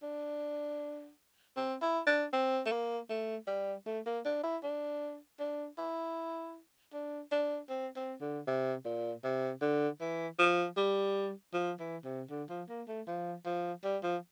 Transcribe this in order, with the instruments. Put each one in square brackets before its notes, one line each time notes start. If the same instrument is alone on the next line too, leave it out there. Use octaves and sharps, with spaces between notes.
[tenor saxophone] D4
C4
E4
D4
C4
A3
A#3
A3
G3
A3
A#3
D4
E4
D4
D4
E4
D4
D4
C4
C4
D3
C3
A#2
C3
D3
E3
F3
G3
F3
E3
C3
D3
F3
A#3
A3
F3
F3
G3
F3